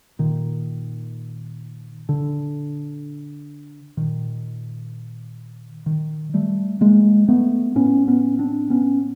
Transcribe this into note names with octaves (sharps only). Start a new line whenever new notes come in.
A#2 D#3
D3
A#2 D#3
D#3
G3 A3
G#3 A#3
A3 B3
A2 B3 C#4
B3 C#4
C4 D4
B3 C#4